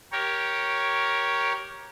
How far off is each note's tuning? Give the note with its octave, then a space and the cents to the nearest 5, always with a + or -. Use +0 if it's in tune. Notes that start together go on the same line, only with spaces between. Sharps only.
G4 -10 A#4 +10 C#5 +0